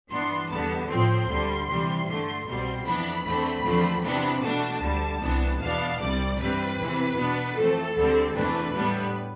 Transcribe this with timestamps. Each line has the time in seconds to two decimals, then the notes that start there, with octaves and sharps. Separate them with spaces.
0.10 G2 E3 B3 D4 C6
0.50 E2 D3 G3 B3 A5
0.89 A2 F3 C4 C6
1.28 D2 D3 G3 C6
1.68 C3 E3 G3
2.07 G2 D3 A3 C6
2.46 C2 B2 G3 C4 C6
2.85 F2 E3 B3 D4 B5
3.25 E2 D3 A3 C4
3.64 E2 D3 F3 A3 C4
4.03 C3 E3 B3 D4 B5
4.42 B2 A3 D4 A5
4.82 D2 D3 G3
5.21 C2 C3 E3 B3 D4
5.60 E2 B2 B3 D4 F5
5.99 C2 C3 G3 D5
6.38 G2 E3 G3 C4 B4
6.78 E2 C3 E3
7.16 B2 B3 D4
7.56 F2 E3 A3 C4 A4
7.95 D2 D3 G3 C4
8.34 E2 C3 E3 A3 D4 B4
8.74 A2 G3 B3 D4